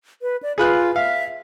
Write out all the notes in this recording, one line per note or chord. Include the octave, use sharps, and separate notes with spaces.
B4
D5
F4 G#4 B4 F#6
E5 F5